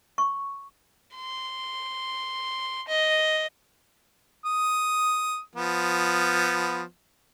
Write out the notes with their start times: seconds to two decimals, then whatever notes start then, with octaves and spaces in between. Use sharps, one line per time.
0.18 C#6
1.15 C6
2.87 D#5
4.45 D#6
5.55 F3 B3